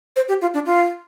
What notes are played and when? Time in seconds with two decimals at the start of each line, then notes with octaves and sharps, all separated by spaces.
0.16 C5
0.28 G4
0.41 F4
0.54 D4
0.66 F4